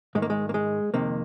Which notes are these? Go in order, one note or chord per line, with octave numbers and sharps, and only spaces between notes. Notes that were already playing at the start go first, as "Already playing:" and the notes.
G#2 D#3 G#3
A#3
G#3
A#3
G#3
F2 C3 D#3 A#3